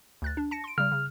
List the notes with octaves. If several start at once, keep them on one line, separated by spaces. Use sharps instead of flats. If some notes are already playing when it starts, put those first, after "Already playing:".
D2 F#6 A6
D4
A5 A#6 C#7
C6 D7
C#3 G3 F6
C#3